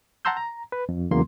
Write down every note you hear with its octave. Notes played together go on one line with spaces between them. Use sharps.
F#5 A5 A#5 C6 E6 G6
A#5
B4
F2
E2 C#3 E3 F#3 A#3 C6